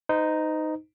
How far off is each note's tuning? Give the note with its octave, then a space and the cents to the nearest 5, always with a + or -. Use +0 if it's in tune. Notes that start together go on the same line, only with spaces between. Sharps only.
D#4 +0 C5 -40